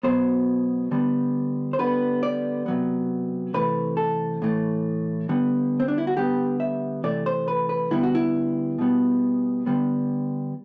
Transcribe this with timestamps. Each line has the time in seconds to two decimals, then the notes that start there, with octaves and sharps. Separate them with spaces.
0.03 B2 F#3 B3 C5
0.91 D3 G3 B3
1.73 C5
1.79 D3 G3 B3 B4
2.23 D5
2.66 C3 F#3 B3
3.54 C3 E3 A3 B4
3.97 A4
4.42 A2 E3 A3
5.29 D3 G3 B3
5.80 C4
5.88 D4
5.98 E4
6.07 F#4
6.16 D3 G3 B3 G4
6.60 E5
7.04 C3 E3 A3 D5
7.26 C5
7.48 B4
7.69 B4
7.91 D3 G3 B3 E4
8.03 F#4
8.15 E4
8.78 B2 G3 B3
9.66 D3 G3 B3